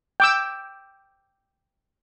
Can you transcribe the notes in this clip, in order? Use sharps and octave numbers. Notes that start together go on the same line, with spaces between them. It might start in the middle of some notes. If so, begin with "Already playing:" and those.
G5 D6 E6